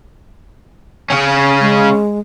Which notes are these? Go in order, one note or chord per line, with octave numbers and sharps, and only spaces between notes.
C#3 C#4
G#3